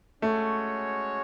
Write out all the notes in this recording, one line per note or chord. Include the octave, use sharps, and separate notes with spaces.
G#3 A3 C#4 F#4 C#5